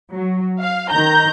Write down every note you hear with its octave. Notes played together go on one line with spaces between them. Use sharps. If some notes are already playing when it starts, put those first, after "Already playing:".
F#3
F5
D#3 A#5 G6